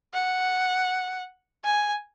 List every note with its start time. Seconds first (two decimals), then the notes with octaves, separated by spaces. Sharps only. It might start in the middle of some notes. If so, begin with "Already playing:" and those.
0.14 F#5
1.65 G#5